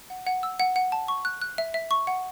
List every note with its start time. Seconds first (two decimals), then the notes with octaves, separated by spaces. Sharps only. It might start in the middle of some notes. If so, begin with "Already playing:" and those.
0.10 F#5
0.27 F#5
0.43 E6
0.60 F#5
0.76 F#5
0.92 A5
1.08 C#6
1.25 F#6
1.42 F#6
1.58 E5
1.74 E5
1.91 C#6
2.07 F#5